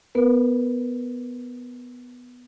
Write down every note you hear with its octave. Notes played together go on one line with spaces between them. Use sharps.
B3 A#4 B4